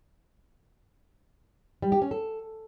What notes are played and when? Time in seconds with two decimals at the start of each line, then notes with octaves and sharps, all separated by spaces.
1.82 G3
1.92 G4
2.02 C#4
2.11 A4